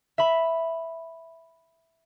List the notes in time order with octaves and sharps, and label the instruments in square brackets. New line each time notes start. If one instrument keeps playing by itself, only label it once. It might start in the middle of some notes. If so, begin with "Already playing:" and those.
[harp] E5 B5